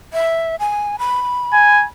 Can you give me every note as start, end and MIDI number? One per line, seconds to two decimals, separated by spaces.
0.13 0.55 76
0.59 0.96 80
0.99 1.84 83
1.53 1.85 80